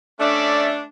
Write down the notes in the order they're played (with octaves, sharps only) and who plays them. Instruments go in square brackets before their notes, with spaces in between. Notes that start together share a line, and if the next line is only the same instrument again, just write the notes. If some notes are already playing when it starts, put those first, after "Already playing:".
[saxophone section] A3 D4 [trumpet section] C#4 D5 E5